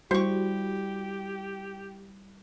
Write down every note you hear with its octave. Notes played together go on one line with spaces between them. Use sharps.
G3 E4 F#4 G4 C5 C#6